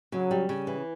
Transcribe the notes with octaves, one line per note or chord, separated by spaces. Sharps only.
C#3 F#3
G3
C#3
E3